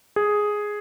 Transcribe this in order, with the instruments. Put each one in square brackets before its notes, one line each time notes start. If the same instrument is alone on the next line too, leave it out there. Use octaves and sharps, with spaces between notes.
[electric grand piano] G#4